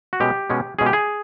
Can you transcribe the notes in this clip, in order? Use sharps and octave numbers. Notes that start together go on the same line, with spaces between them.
F#4
B2 G#3 C#4 G4
B2 G#3 C#4
B2 G#3 C#4 G#4
G4
G#4